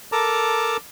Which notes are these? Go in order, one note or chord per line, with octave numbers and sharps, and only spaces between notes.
A4 A#4 A5 A#5 D6